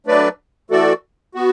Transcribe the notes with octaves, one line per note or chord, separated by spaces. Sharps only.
F#3 A3 D4 B4 D5
E3 A3 F#4 A4 D5
B3 F#4